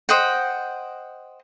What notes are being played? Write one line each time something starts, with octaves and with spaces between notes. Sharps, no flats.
C5 D#5 F#5 G5